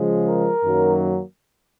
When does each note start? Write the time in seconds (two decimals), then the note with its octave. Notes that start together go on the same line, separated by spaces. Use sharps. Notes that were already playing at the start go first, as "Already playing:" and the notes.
Already playing: C#3 F3 G#3
0.29 A#4
0.64 F#2 D#3 F#3 A#3